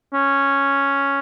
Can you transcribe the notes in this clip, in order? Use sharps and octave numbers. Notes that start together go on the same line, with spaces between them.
C#4